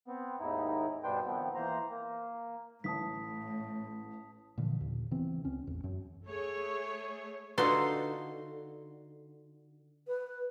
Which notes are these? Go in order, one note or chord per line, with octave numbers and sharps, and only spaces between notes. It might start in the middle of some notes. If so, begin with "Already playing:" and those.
B3 C4
D#2 G#2 D#4 E4
G2 B2 B3 D4 C5 G5
D#3 F3 B3 C4
E2 A#3 C5 A#5
A#3
A1 A2 A5 D#6 B6
A#2 D3 E3 F3
D#2 A#2
C#3 E3 B3 C4
C#2 C4 C#4
A1 E2
F#2
A3 G#4 C#5
D3 D#4 F4 F#4 A4 B4 C6
B4